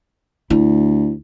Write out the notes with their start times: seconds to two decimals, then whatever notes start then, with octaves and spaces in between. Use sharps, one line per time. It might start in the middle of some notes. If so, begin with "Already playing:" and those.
0.50 D2 E4